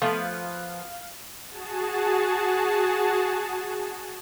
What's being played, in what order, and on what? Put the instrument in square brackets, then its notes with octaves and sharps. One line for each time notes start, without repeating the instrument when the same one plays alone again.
[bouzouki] F3 B3 B4 [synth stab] A3 [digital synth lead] F5
[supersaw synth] F#4 G#4 A5